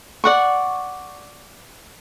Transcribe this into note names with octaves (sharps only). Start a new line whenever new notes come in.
D5 F#5 C#6